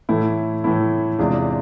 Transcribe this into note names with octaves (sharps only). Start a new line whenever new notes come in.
A2 E3 A3 E4
A2 E3 A3 E4
E2 C3 G#3 D4 F4